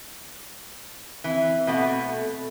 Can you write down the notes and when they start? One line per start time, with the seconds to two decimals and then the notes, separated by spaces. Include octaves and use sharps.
1.24 E3 C4
1.67 B2 A3 F#5